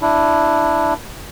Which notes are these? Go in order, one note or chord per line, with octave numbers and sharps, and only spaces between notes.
D4 E4